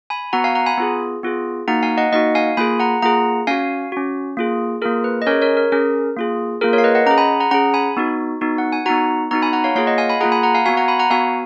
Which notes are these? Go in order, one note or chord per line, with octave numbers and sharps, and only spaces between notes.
G#5 B5
B3 F#4 F#5 A#5
F5 G#5
F#5 A#5
G#5 B5
B3 F4 G#4
B3 F4 G#4
A#3 D#4 F#4 F#5 A#5
F5 G#5
D#5 F#5
A#3 D#4 F#4 D#5 F#5
F5 G#5
A#3 F4 G#4 G#5 B5
F#5 A#5
A#3 F4 G#4 F#5 A#5
C#4 F#4 F5 G#5
C#4 F#4
A#3 F4 G#4
A#3 F4 G#4 A#4
B4
D#5
C#4 G#4 A#4 C#5
A#4 C#5
A#4
C#4 G#4 A#4
A#3 F4 G#4
A#3 F4 G#4 A#4
A#4 C#5
F5
B4 D#5
D#5 F#5
C#4 G#4 F#5 A#5
G#5 B5
F#5 A#5
C#4 G#4 F#5 A#5
G#5 B5
B3 D#4 F#4
B3 D#4 F#4
F#5
G#5
B3 D#4 F#4 F#5 A#5
B3 D#4 F#4 F#5 A#5
G#5 B5
F#5 A#5
C#5 F5
A#3 F4 G#4 C#5 F5
D#5 F#5
F5 G#5
G#5 B5
A#3 F4 G#4 F#5 A#5
G#5 B5
F#5 A#5
F5 G#5
B3 F#4 F5 G#5
F#5 A#5
G#5 B5
F#5 A#5
B3 F#4 F5 G#5